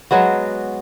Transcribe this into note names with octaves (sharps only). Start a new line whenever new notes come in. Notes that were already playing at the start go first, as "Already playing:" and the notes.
F#3 G#3 B3 F#4